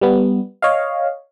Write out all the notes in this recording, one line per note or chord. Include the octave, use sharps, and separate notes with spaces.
G3 B3
C#5 D#5 F5